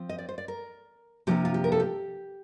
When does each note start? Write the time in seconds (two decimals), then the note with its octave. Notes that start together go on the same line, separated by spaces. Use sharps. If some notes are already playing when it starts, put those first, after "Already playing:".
Already playing: F3 C4
0.09 D#5
0.18 D5
0.29 C5
0.38 D5
0.48 A#4
1.27 C3 F3 A#3 D4 F4 G4
1.45 F4
1.54 G4
1.64 A#4
1.72 A4
1.80 G4